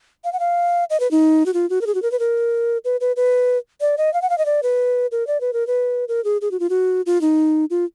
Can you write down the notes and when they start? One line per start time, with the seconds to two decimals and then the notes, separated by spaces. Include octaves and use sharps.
0.24 F5
0.33 F#5
0.40 F5
0.90 D#5
1.00 B4
1.11 D#4
1.46 F#4
1.54 F4
1.70 F#4
1.81 A#4
1.87 G#4
1.95 F#4
2.02 A#4
2.12 B4
2.19 A#4
2.85 B4
3.01 B4
3.16 B4
3.81 D5
3.98 D#5
4.14 F5
4.22 F#5
4.30 F5
4.38 D#5
4.46 D5
4.63 B4
5.12 A#4
5.27 D5
5.41 B4
5.53 A#4
5.67 B4
6.08 A#4
6.24 G#4
6.41 G#4
6.51 F#4
6.60 F4
6.70 F#4
7.06 F4
7.21 D#4
7.70 F4